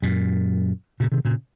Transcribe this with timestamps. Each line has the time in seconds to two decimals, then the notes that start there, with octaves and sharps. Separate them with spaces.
0.02 F#2 A#2
1.00 A#2 C#3
1.12 C3 D#3
1.25 A#2 C#3